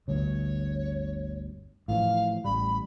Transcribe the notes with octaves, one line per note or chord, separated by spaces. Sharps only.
G1 D2 G2 C#5
A2 E3 F3 F5
A1 G3 B5